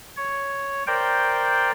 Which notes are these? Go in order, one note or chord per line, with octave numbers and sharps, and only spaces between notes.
C#5
A#4 C5 D5 G5